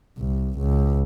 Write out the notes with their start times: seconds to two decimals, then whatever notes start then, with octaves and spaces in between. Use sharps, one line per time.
0.19 C2
0.58 C#2